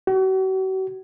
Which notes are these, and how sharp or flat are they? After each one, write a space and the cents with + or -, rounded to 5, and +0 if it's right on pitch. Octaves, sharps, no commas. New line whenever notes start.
F#4 +40